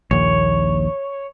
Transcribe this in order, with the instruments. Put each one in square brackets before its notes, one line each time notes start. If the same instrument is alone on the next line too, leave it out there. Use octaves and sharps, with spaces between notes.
[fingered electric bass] A#1 D#2 [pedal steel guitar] C#5